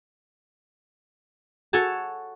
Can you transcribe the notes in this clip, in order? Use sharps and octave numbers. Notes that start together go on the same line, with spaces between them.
F#4 A4 C#5 G#5 A5